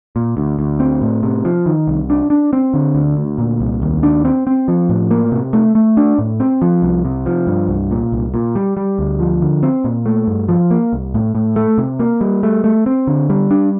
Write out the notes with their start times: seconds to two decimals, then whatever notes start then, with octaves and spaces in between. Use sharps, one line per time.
0.16 A#2
0.37 D2
0.59 D2
0.80 C4
1.02 A2
1.23 C3
1.45 F3
1.66 D#3
1.88 C2
2.10 D4
2.30 D4
2.53 C4
2.74 D3
2.95 D2
3.17 D2
3.38 A#2
3.60 C2
3.82 D#2
4.03 D4
4.25 C4
4.47 C4
4.68 F3
4.89 A2
5.11 A#3
5.32 C3
5.53 A3
5.75 A3
5.97 D4
6.19 A2
6.40 C4
6.62 F3
6.83 C2
7.05 C3
7.26 F3
7.47 G2
7.69 C2
7.91 A#2
8.12 C2
8.34 A#2
8.55 G3
8.77 G3
8.99 D2
9.20 F3
9.42 D3
9.63 C4
9.84 A#2
10.06 A3
10.28 G2
10.49 F3
10.71 A#3
10.93 C2
11.14 A2
11.35 A2
11.56 A3
11.78 C3
11.99 A#3
12.21 G3
12.43 A3
12.64 A3
12.86 C4
13.07 D3
13.30 G3
13.51 D4